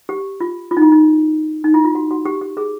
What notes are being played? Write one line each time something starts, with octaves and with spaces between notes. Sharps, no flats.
G4
F4
F4
D#4
E4
D#4
D#4
E4
F4
F#4
F#4
G4
G4
G#4